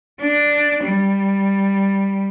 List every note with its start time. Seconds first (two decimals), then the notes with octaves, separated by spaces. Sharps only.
0.21 D4
0.84 G3